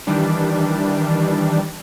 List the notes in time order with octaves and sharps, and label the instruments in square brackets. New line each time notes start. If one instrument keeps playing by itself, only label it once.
[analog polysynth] D#3 E3 G3 D4